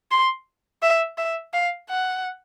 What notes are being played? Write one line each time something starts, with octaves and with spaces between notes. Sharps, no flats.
C6
E5
E5
F5
F#5